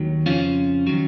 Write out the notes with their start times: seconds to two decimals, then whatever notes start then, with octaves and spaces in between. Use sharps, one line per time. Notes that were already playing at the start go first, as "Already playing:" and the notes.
Already playing: D#2 D#3 F#3
0.26 F2 C#3 F3 C#4 F4
0.87 D#3 F#3